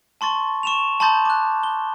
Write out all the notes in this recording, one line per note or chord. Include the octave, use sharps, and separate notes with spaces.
A5 C6 C#6 A6
C#6 E7 F7
A5 B5 C6 D#6 G6 A6
D6 F#6
G7